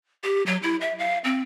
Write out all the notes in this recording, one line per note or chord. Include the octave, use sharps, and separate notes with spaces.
G4
F#3
E4
E5
F5
C4